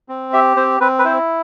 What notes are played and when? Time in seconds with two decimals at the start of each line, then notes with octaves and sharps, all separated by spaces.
0.09 C4
0.33 G4 E5
0.56 C4 C5
0.81 C4 B4
0.99 B4
1.05 E4 C5